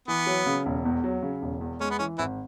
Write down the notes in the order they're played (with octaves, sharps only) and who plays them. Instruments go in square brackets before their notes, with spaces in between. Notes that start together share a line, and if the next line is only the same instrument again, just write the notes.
[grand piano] E3 [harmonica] B3
[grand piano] F#3
C#3
E1
E2
F#3
C#3
E1
E2
[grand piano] G#3 [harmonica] C#4
[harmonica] B3
[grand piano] E3 [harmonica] C#4
[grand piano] G#1 [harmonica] E3 E4